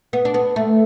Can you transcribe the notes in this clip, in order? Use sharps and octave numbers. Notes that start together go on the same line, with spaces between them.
B3
D4
B3
A3